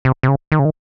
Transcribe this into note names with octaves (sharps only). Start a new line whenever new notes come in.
C3
C3
C#3
D#3
C#3
D#3